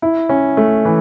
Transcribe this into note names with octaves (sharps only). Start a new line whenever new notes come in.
E4
C#4
A3
E3